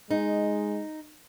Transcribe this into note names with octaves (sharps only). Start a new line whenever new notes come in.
G#3 D#4